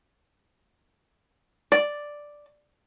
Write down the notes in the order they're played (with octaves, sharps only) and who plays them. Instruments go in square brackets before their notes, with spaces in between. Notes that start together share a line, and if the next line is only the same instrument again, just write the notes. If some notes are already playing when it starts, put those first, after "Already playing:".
[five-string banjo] D5